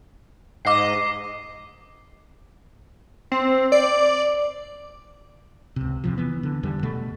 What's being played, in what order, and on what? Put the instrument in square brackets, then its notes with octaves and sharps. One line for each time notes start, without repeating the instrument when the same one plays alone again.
[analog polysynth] G#2 D#5 [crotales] D6 C7
[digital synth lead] C4
D5
[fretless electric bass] C#2 C3
E2 C3 F3
E3 B3
D3
E2 D3 G3
E1 B2 A3